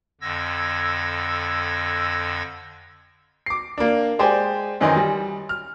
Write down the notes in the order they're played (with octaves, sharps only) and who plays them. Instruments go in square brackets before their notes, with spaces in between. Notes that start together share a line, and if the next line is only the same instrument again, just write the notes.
[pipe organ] F2 D3 E6 G#6 A#6
[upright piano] D6 C7
A#3 D4
G#3 G4 C5 D5 G#5
F#2 D#3 E3 D#4 C6
G3
F6